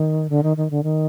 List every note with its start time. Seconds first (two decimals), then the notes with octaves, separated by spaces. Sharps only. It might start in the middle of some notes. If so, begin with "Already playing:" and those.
Already playing: D#3
0.30 D3
0.43 D#3
0.57 D#3
0.71 D3
0.83 D#3